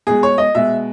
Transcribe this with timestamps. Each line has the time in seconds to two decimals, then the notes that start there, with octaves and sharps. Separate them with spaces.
0.07 B2 G#3 G#4
0.23 C#5
0.38 D#5
0.55 B2 G#3 E5